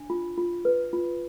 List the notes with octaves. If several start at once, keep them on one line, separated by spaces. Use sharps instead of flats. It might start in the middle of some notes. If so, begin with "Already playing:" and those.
Already playing: D4
F4
F4
B4
F4